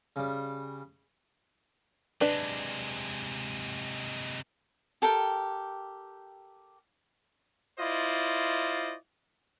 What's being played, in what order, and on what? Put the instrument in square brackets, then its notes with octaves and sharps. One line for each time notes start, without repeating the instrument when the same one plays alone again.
[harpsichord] C#3 G3
[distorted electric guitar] C3 G#3 [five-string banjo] D4 B4
[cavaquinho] G4 A4 A#4 G5
[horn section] E4 F4 C5 D5 D#5